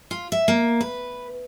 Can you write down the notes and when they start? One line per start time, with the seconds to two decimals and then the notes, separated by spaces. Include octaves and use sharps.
0.11 F4
0.32 E5
0.48 A#3
0.81 B4